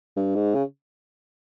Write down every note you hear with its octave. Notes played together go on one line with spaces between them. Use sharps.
G2
G#2
C#3